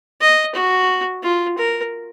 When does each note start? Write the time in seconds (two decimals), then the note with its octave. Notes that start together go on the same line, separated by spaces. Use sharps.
0.21 D#5
0.55 F#4
1.23 F4
1.58 A#4